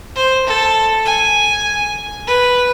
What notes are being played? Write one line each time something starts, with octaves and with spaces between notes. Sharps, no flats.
C5
A4
G#5
B4